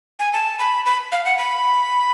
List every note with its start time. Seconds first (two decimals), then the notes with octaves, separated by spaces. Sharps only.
0.19 G#5
0.33 A5
0.59 B5
0.85 B5
1.12 F5
1.25 F#5
1.38 B5